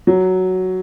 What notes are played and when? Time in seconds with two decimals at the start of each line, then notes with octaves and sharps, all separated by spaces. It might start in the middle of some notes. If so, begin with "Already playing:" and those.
0.07 F#3